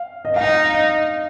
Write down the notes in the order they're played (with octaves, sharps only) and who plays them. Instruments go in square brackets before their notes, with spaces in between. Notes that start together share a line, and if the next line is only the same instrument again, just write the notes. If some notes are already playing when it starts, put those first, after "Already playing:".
Already playing: [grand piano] F5
D#5
[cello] D#4 [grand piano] F5